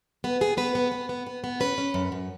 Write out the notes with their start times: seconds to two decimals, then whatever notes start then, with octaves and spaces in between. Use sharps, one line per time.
0.24 B3 B4
0.41 B3 G#4
0.57 B3 B4
0.75 B3
0.92 B3
1.09 B3
1.27 B3
1.44 B3
1.60 C#4 B4
1.78 C#4
1.94 F#2
2.12 F#2